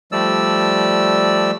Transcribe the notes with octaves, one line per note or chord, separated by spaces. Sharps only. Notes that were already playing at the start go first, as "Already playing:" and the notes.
F3 G3 A3 D5 E6